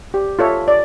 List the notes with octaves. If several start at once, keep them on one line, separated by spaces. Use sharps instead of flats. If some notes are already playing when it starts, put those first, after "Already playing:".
G4
F4 A4 C#5 E5
D5